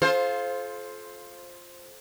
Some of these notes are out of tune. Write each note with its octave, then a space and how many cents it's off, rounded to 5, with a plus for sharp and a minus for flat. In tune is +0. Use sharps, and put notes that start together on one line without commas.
F4 +0 A4 -35 C5 +10